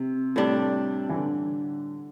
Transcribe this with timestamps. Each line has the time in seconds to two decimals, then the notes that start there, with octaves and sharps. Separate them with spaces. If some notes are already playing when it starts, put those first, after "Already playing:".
Already playing: C3
0.36 A2 G3 D4
1.09 E3
1.14 D3